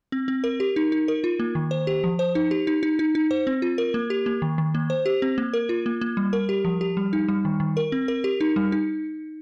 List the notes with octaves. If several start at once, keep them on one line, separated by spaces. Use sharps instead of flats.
C4
C4
A#4
G4
D#4
D#4
A#4
F4
A#3
D#3
C5
G4
F3
C5
D#4
G4
D#4
D#4
D#4
D#4
C5
C4
F4
A#4
A#3
G4
A#3
D#3
D#3
A#3
C5
G4
C4
A#3
A#4
F4
A#3
A#3
G3
A#4
G4
F3
G4
G3
D#4
G3
D#3
D#3
A#4
C4
A#4
G4
D#4
G3
D#4